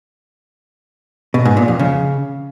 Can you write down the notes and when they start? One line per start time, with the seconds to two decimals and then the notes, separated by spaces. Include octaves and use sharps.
1.34 B2
1.45 G#2
1.57 A#2
1.68 F2
1.79 C#3